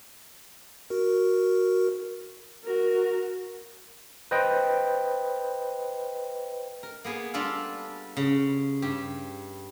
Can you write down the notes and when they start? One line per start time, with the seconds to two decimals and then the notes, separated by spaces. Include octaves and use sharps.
0.90 F#4 A#4
2.64 F#4 A#4
4.31 B4 C5 D#5 G5
6.83 A#4
7.04 A#3 B3 G#4
7.34 G3 D4 F4 A4 F5
8.17 C#3
8.82 G2 G4